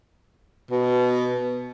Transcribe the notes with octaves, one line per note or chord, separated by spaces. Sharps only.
B2